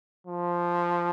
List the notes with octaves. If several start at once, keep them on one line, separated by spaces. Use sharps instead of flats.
F3